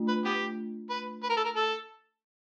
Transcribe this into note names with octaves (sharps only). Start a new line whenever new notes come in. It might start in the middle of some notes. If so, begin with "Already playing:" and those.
Already playing: A3 D4 F4
B4
B3 G4
B4
B4
A#4
A4
A#4
A4